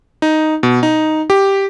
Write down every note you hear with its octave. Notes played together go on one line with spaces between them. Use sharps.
D#4
B2
D#4
G4